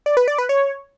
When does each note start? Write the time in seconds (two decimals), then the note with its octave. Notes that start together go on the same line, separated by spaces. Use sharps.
0.06 D5
0.17 B4
0.28 D5
0.38 B4
0.49 C#5